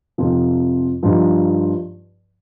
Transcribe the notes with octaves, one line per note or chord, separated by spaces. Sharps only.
F2 C3 F3 D#4
G2 F3 D#4